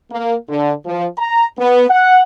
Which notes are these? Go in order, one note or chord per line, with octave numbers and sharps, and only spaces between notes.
A#3
D3
F3
A#5
B3
F#5